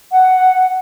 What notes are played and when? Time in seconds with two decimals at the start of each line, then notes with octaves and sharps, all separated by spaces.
0.12 F#5